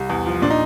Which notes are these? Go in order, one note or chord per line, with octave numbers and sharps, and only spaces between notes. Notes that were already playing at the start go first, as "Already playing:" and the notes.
Already playing: C2
E2
F3
A#2 D4
D#4